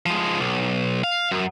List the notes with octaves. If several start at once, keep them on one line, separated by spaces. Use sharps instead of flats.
F3 G#3
B1
F5
F#2